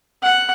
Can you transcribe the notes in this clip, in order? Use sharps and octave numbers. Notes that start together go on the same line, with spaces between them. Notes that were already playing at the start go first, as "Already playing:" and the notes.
F#5